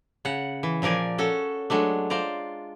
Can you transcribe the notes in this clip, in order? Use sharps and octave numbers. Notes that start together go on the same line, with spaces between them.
C#3 F#5
E3
A#2 F3 A#4 D5 G#5
C#4 F#4 A4
F#3 G#3 A3 D4
F4 C5 D5 A#5